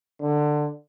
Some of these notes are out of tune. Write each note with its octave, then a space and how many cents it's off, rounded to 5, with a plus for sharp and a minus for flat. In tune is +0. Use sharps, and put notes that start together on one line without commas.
D3 +15